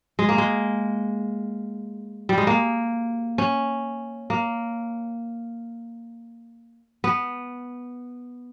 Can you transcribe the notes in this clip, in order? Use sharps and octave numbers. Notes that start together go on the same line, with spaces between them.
G#3
A#3
G#3
G3
G#3
A#3
C#4
A#3
B3